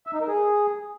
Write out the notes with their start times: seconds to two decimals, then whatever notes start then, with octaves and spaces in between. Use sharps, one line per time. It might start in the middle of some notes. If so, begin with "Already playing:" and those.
0.07 E5
0.14 D#4
0.21 A#4
0.28 G#4